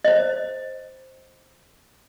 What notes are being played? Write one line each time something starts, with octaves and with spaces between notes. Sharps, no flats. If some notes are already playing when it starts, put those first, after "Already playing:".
C5 D#5